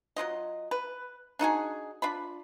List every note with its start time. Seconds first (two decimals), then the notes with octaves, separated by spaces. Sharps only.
0.16 F#3 A3 F4 D#5
0.71 B4
1.39 D4 D#4 F#4 G#4
2.02 D4 F4 B5